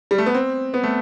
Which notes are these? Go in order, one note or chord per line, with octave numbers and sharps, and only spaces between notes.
G3
A3
B3
C4
B3
A3